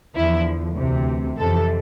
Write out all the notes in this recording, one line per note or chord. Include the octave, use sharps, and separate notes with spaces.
E2 D3 F3 E4
D2 C3 E3
F2 C3 E3 A4